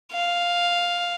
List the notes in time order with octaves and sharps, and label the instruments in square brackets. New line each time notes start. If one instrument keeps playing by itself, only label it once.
[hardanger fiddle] F5